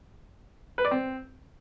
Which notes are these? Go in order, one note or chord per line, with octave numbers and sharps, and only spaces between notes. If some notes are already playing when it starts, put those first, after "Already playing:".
B4
D5
C4